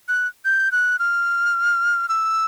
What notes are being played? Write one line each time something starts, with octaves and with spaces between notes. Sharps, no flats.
F#6
G6
F#6
F6
E6